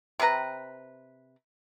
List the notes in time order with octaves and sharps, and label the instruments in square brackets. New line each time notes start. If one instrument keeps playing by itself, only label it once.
[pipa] C3 C4 B4 A#5